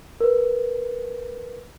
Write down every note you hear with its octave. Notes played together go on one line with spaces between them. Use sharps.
A#4 B4